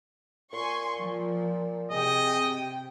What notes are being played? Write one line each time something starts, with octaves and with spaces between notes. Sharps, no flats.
A#2 G#5 C6 C#6
F3
C3 G#4 D#5 G5